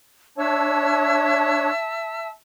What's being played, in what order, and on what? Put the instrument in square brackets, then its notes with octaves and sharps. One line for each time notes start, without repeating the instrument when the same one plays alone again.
[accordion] D4 C#5 [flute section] E5 A5 E6